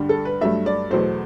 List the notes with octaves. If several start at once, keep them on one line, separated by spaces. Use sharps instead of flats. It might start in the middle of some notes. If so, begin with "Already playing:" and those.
Already playing: G2 D3 G3
A4
B4
G2 F#3 A3 E5
D5
E2 B2 F#3 A3 C5